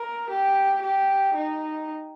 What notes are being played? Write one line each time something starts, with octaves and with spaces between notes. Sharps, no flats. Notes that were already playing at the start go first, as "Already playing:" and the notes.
Already playing: A#4
G4
G4
D#4